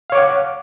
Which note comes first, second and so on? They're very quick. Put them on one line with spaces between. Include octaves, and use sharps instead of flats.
F5 C#5 D6 F#5